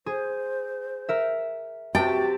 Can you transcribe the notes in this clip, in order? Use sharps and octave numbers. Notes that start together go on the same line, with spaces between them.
G#4 C5
A#4 E5
C3 F#4 G4 G5 A5